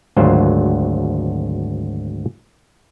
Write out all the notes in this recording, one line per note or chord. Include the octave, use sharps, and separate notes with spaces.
G#1 D2 F#3 F4 C5